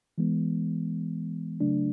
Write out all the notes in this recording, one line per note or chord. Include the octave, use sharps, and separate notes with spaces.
E3 G#3 B3
C#3 F#3 A3 D4